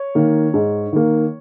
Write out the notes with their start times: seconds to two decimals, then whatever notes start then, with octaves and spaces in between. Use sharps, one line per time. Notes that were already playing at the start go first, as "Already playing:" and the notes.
Already playing: C#5
0.15 D#3 A#3
0.54 G#2
0.93 D#3 A#3